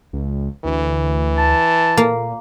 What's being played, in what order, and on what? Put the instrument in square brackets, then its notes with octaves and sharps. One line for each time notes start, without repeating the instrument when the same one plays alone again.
[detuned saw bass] C#2
[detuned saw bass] D2 [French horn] E3
[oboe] A5
[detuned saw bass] A#2 [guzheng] A#3